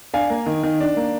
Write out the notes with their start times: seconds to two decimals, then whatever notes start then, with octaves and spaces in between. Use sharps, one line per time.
0.14 D4 F5 G#5
0.30 A#3
0.46 D#3
0.63 D#3
0.80 D4
0.97 A#3